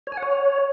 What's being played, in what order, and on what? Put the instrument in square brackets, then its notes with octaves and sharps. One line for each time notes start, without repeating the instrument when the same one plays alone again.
[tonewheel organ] C#5
G#5
F#5
C#5